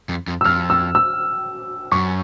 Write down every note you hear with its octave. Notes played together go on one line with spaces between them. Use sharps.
F2
F2
E6
F2 F6
E6
E6
F#2 C#6